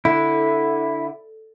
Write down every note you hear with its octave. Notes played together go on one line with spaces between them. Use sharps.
D3 E4